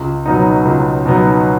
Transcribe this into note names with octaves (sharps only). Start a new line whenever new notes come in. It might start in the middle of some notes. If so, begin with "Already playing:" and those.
Already playing: C#2
B2 F#3 B3 D#4
C#2
B2 F#3 B3 D#4